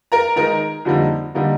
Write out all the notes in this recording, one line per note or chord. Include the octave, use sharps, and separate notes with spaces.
A#4 A#5
D#3 G#3 D#4 A#4 A#5
F2 D3 G3 A#3 D#4
D3 G3 A#3 D#4